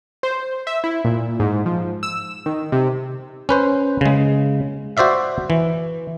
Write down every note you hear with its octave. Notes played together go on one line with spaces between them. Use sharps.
C5
E5
E4
A#2
G#2
F3
E6
D#3
C3
C#4 B4 C5
C#3 G#3
F#4 C5 D5 E5 F5
E3